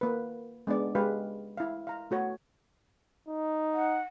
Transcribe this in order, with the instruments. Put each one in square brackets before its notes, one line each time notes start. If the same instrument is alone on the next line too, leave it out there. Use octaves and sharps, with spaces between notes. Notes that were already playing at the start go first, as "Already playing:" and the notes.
[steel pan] A#3 B4
G#3 B3 D4 D5
G#3 G4 B4 F5
E4 F5
F5 A#5
A3 F#4 C#5
[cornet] D#4
[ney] F#5